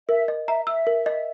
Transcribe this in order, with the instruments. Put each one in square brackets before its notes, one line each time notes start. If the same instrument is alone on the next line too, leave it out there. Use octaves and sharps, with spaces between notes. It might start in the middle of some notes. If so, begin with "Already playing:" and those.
[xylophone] A#4 [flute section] E5
[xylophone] D#5
[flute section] E5 [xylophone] A#5
[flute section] E5 [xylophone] E6
[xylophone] A#4
D#5